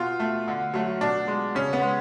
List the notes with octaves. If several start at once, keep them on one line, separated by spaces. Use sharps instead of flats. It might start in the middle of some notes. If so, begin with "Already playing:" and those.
Already playing: B2 F4
A3
D3
F#3 A3
B2 D4
G#3
C#3 C#4
B3
G#3